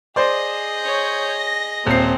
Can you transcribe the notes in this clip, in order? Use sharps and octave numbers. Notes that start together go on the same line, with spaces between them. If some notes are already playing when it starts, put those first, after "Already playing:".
G#4 C5 D5 D#5
C#5 G6
A#6
D#1 C4 C5 C7